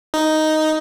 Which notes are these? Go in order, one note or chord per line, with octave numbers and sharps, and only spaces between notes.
D#4